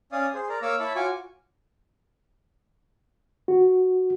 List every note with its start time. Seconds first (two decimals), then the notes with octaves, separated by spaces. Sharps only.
0.12 C#4 D5 F5 D#6
0.34 G#4 C5
0.49 A#4 D5 A#5
0.62 A#3 C#5 F5 D6 E6
0.80 E4 C#5 E5 A5 B5
0.96 F4 F#4 C#5 G#5 C#6 D6
3.48 F#4